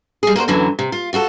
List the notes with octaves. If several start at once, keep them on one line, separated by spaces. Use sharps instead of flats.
G3 G#4
A#3 F#4 A4 C5
F#2 D3 E3 F#3
C3
F4
F4 F#4 G#4 A4